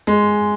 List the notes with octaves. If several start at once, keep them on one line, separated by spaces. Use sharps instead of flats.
G#3